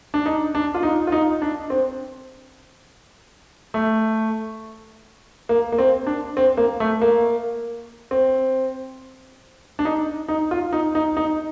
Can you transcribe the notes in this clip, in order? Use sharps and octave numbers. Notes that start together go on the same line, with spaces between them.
D4
D#4
D4
F4
D#4
F4
D#4
D4
C4
A3
A#3
A#3
C4
D4
C4
A#3
A3
A#3
C4
D4
D#4
D#4
F4
D#4
D#4
D#4